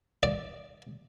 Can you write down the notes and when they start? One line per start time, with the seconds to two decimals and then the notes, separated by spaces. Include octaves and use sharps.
0.23 D5